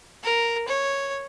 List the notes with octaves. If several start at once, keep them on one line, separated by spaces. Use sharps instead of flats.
A#4
C#5